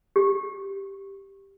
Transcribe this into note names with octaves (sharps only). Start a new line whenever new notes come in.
G4